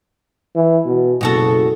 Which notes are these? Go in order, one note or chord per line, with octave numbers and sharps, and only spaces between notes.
E3
B2
F#1 B2 F#4 A4